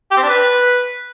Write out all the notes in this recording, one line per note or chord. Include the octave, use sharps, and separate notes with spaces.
G4
C4
D4
B4